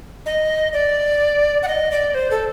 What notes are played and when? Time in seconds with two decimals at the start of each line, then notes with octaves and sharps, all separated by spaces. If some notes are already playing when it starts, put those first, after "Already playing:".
0.26 D#5
0.73 D5
1.63 F#5
1.68 D#5
1.91 D5
2.14 C5
2.31 A4